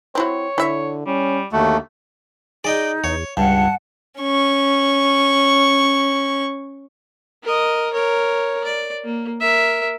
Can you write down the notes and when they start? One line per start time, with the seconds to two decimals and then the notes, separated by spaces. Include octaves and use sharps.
0.15 C4 E4 F#4 C#5
0.58 D3 E4 E5
1.06 G3 C#4
1.53 D#2 D3 A3 F#4
2.64 D#4 G#4 D5 D#5 G5
3.04 E2 C#5
3.37 C#2 G2 F#5 A5
4.20 C#4 C#6
7.44 A#4 D#5
7.93 A#4 C#5
8.64 D5
9.04 A#3
9.40 A#4 E5